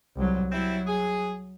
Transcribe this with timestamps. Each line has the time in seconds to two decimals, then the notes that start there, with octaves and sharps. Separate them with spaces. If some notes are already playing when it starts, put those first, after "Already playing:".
0.16 C2 F#3
0.51 F#3 G3 C4 E4
0.87 G#4